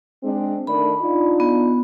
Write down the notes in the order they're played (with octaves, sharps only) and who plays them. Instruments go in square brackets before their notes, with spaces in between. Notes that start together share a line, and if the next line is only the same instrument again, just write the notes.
[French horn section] G#3 C4 D4
[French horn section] D#3 A3 D4 [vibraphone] B5
[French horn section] D4 D#4 F4
[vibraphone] B3